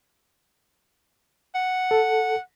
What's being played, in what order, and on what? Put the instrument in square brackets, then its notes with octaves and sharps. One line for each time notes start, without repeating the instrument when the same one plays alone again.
[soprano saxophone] F#5
[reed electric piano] A4